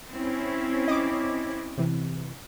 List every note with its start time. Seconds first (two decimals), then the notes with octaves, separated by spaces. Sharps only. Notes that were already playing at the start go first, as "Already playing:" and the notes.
0.11 C4 C#4 E4
0.88 D#5 D6
1.78 C3 E3